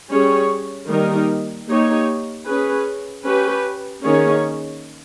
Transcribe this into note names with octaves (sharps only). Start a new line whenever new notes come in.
G3 C#4 G#4 C#5
D#3 G3 A#3 D#4 A#4
A#3 D#4 G4 C#5
C#4 G#4 B4
C#4 G4 B4
D#3 A#3 C#4 G#4 C#5